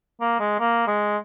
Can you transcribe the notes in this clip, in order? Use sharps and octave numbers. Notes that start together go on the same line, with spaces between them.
A#3
G#3
A#3
G#3